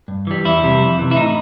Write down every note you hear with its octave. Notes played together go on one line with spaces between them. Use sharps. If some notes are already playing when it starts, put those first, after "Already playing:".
G2
E3 G3
E2 E4
C3 E3 G3
F2
C3 E3
E4
A2 D#4